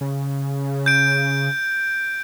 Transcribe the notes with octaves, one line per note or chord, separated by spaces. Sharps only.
C#3
G6 D7